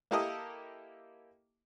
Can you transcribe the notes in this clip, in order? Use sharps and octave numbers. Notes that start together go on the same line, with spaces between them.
A#3 E4 G4 A4 A#4 D#5